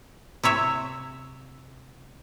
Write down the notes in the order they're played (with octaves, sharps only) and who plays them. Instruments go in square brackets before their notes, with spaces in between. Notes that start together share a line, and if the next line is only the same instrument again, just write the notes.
[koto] C3 E4 C#5 E5